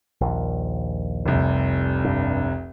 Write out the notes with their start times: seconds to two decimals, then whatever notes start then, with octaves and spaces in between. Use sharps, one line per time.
0.21 A#1 D#2
1.26 F1 C2
2.05 G2